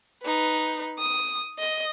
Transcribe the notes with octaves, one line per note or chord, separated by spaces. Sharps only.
D#4 B4
D#6
D#5